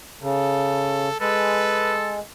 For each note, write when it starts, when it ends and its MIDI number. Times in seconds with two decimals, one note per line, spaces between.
0.22 1.09 49
0.22 1.16 69
1.21 2.20 56
1.21 2.18 69
1.21 1.96 71